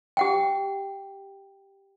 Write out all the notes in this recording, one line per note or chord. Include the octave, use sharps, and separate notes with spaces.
G4 F#5 G5